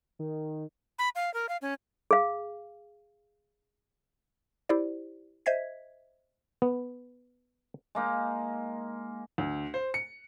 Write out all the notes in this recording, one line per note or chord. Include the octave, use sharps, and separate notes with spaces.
D#3
B5
F5
A#4
F5
C#4
G#4 F5
E4 G4 C5 D5
C5 D#5 E5 G#6 B6
B3
G#3 A#3 D#4
D2
C5
C#7